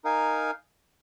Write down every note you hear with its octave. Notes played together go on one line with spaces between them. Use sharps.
D#4 A#4 F5 G#5